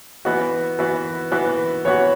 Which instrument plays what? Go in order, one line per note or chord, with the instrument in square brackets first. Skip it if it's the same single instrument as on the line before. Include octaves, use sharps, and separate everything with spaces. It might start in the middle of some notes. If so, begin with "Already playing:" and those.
[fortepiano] E3 B3 F#4 [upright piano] D#5
[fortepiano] E3 B3 F#4
E3 B3 F#4
[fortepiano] E3 B3 F#4 [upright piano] C#5